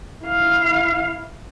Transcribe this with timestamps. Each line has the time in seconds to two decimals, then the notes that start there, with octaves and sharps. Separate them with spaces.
0.25 E4 F5